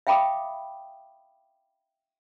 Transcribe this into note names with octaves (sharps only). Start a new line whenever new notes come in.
E5 F5 G5 B5 D6 D#6